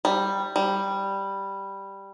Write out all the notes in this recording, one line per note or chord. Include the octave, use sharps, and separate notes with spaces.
G3
G3